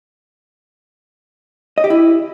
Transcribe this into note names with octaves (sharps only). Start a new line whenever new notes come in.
D#5
G4
E4